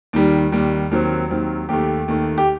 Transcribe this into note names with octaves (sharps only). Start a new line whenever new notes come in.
D#2 D#3 G3
D#2 D#3 G3
D#2 D#3 F#3 C4
D#2 D#3 F#3 C4
D#2 D#3 A3 G4
D#2 D#3 A3
G4